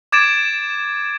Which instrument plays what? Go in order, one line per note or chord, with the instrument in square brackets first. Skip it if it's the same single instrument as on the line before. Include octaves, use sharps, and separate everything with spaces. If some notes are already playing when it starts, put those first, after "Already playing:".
[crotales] D6 G#6 A6 D7 E7